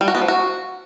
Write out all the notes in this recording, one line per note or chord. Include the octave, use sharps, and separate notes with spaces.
G3
F#4
B3
F3
F#4